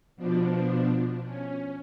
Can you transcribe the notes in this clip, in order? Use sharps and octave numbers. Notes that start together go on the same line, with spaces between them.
B2 F3 D4
C#4